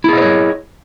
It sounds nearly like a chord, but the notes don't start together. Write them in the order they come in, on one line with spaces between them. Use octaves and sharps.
E4 G#4 D#5 C5 C#5